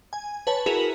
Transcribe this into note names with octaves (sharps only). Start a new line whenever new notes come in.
G#5
B4 C#5 A5
E4 F#4 G#4 A#4 B4